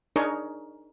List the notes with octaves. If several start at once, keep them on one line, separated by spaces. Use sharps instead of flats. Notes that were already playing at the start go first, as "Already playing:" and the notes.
D4 D#4 G#4 A#4 C#5 D#5